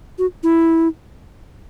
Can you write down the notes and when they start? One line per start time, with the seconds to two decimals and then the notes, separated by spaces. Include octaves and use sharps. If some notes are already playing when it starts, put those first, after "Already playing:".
0.19 F#4
0.43 E4